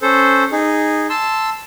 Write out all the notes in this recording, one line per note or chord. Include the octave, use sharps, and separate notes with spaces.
C#4 A4 C5
D#4 G#4
A5 C6 E6